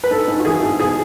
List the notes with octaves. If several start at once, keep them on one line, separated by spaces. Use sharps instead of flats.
B4
G#2 A4
G#2
F#4
E3 G#4
G#2
B2 G#4